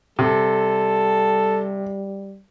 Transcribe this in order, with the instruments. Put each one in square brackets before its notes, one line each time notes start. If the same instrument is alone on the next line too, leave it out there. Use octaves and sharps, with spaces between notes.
[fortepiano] C3 [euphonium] G3 [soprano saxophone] A4